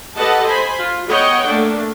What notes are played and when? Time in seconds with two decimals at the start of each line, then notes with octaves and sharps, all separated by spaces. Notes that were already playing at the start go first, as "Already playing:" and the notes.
0.16 G4 A4 B4 D#5 F#5 A5
0.46 C5 G#5 B5
0.78 F4
1.09 B3 C#5 D#5 F#5 G5
1.47 A3 A#3 D4